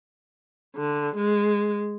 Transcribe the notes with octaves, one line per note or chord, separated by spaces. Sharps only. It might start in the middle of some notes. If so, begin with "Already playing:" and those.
D3
G#3